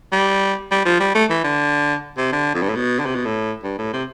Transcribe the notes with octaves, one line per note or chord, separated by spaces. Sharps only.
G3
G3
F3
G3
A3
E3
D3
C3
D3
F2
G2
A2
B2
D3
C3
B2
A2
G2
A2
C3